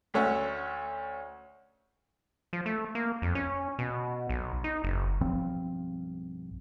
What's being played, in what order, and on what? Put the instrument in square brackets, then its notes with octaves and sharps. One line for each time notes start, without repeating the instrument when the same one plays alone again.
[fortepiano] D2 A3 C#4 E5 F#5
[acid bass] F3
A3
A#3
F2
C#4
B2
B1
D#4
F#1
[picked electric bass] B1 G2 F3 C4